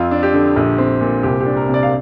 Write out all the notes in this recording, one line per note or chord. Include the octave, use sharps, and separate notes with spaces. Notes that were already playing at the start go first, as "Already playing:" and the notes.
Already playing: F2 F4
D4
G4
D3
A#1
C4
A#2
C2 G4
G4
D4
A#4
C3
D5
F5